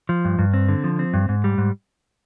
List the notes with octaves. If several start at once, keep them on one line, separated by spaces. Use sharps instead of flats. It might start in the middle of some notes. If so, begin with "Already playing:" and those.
F3
G2
G2
C4
D3
F3
C4
G2
G#2
G3
G#2